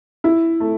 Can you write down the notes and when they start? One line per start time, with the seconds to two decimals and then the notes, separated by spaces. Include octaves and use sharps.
0.24 E4
0.60 A3